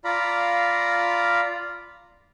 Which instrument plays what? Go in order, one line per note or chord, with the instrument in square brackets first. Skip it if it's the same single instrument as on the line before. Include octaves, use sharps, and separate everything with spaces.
[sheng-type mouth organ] F4 D5 F5 A#5 B5